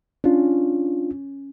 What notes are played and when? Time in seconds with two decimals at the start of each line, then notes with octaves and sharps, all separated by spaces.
0.24 C#4 D4 F4